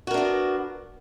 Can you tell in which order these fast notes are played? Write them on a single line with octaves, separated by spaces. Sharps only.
F#4 A#4 D4 B3